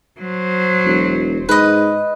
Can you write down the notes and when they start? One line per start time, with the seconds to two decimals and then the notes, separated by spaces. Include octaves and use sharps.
0.19 F#3 C5
0.85 E1
1.49 G#2 B4 D#5